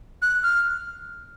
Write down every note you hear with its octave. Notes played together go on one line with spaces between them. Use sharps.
F#6
F6